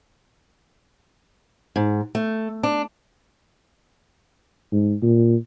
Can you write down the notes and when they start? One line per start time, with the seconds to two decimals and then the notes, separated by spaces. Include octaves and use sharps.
1.76 G#2
2.15 A3
2.63 D4
4.73 G#2
5.03 A#2